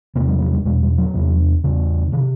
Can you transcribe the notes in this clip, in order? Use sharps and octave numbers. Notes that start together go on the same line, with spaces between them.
E2 C3 A#3
G3
F#3
G3
E2 B2 G#3
G3
F#3
E2 C3
E2 C#3
C3 D#3